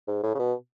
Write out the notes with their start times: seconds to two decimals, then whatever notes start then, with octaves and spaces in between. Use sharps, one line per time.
0.08 G#2
0.23 A2
0.35 C#3
0.39 B2